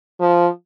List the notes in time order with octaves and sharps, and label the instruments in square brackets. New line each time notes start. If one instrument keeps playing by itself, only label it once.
[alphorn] F3